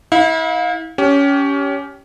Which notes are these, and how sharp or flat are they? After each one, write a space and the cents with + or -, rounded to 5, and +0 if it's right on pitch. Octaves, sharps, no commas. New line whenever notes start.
E4 -35 F5 +30
C#4 +20 G4 -10